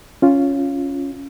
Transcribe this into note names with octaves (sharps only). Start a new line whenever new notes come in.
C#4 F4